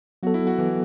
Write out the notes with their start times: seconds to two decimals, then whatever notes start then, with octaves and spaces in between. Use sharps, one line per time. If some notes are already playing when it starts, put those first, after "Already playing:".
0.23 F#3 B3 F#4 A4
0.34 E4
0.47 F#4
0.58 E3